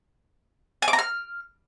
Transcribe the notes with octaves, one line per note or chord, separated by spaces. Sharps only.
G#5
D6
A#5
F6